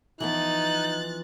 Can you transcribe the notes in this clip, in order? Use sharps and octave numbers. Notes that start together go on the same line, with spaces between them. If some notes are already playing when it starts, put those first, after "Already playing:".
E3 F3 B3 D#4 F#6 A6 F#7